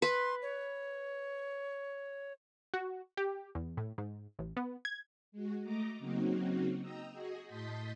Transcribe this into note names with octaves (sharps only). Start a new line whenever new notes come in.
B4 C6
C#5
F#4
G4
E2
A2
G#2
A1
B3
G#6
G#3 F#4
A3 D#5 A#5 D6
C#3 F#3 A#3 C4 D#4 F#4
D#5 G5 A#5 E6
F#4 G#4 D#5
A2 D#5 A5 C6 G6 B6